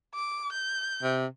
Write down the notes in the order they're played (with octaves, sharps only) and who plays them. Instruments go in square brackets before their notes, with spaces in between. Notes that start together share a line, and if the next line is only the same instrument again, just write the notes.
[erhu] D6
G6
[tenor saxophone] C3